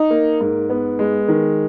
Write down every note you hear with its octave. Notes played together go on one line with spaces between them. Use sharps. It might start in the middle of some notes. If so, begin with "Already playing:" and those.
Already playing: D#4
A#3
G#2
B3
G#3
D#3